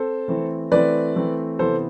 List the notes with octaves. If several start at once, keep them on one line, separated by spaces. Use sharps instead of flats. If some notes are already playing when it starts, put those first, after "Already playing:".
Already playing: C4 A4 C5
E3 A3 C4
E3 A3 C4 B4 D5
E3 A3 C4
C3 E3 B3 A4 C5